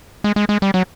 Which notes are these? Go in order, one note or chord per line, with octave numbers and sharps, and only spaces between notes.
G#3
G#3
G#3
G3
F#3